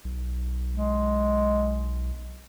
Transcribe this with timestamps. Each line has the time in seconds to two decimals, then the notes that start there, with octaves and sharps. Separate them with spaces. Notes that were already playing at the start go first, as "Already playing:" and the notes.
0.05 B1
0.74 G#3